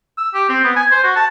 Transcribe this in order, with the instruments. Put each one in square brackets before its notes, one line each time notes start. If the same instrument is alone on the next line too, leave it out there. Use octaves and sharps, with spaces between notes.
[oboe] E6
G4
C4
B3
G#5
C5
F#4
A5